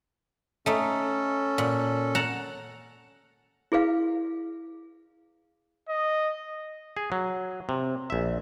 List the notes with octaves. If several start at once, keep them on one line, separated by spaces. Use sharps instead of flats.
A3 C#4 D#4 A4
A#2
F#5 A5 A#5
E4 G#4 B4 F5
D#5
G#4
F#3
C3
A#1 E5